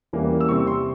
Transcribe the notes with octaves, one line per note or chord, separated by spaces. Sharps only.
E2 E3 G3 A#3 C#4
E6
C3 G3 C4 C#6
C6